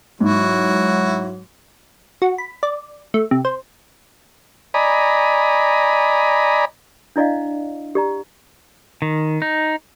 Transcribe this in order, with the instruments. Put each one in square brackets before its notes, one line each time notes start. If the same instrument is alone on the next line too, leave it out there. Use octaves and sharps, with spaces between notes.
[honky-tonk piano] G#2 [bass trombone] F#3 [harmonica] E4 F#4
[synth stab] F#4
B5
D5
A3
C3
C5
[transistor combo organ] D5 D#5 G#5 A#5 B5
[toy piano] D4 E4 D5 D#5 F5
G4 D5 A#5
[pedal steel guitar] D#3
D#4